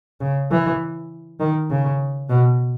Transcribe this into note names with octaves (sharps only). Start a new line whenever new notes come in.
C#3
E3
D#3
C#3
B2